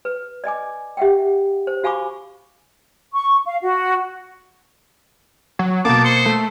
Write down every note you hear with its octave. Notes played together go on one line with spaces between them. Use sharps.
B4
D5 D#5 G#5 D6
G4 E5 F#5 G5
C5
F#4 F5 G#5 B5 C#6 D6
C#6
F5
F#4
F#3
B2 A#3 A5 D6
C5 C#7
A3